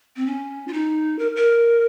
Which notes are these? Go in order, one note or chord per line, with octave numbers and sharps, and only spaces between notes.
C4
C#4
F4
D#4
A#4
A#4